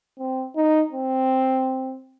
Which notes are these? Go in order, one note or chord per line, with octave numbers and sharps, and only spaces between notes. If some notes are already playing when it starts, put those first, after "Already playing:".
C4
D#4
C4